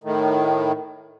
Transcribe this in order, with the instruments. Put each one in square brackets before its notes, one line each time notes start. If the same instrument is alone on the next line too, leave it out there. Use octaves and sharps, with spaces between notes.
[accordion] A2 D#3